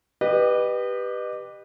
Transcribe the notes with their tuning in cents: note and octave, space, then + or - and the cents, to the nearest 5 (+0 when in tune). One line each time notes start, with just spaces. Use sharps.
G4 +0 B4 -5 D#5 -35